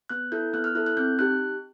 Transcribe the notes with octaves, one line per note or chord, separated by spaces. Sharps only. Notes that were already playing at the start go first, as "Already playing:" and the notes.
B3 F#6
E4 A4 G6
B3 F#6
F6
E4 A4 F#6
F#6
C4 G6
D#4 G4 F#6